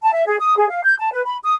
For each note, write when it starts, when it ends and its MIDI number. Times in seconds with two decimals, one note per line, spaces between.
0.02 0.13 81
0.14 0.24 76
0.27 0.38 68
0.40 0.56 87
0.57 0.67 68
0.70 0.81 77
0.84 0.95 91
0.99 1.11 81
1.12 1.23 71
1.25 1.37 83
1.44 1.53 87